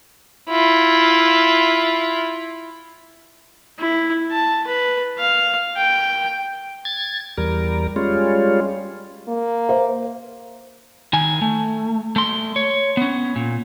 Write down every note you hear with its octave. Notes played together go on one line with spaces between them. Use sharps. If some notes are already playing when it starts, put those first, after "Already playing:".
E4 F4
E4
A5
B4
F5
G5
G#6 A6
E2 G3 A#4
G3 G#3 C#4 F4
A#3
C5
D#3 G#5
A3
A3 C6
C#5
B3 C#4
A#2